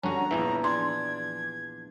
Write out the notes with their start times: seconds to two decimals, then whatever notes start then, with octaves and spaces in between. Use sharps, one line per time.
0.03 G2 D3 C#4 F#4 A#5
0.31 A#1 E2 E3 E4
0.64 D4 C6 G#6